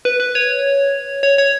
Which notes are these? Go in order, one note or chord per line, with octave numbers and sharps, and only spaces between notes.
B4
B4
C#5
C#5
C#5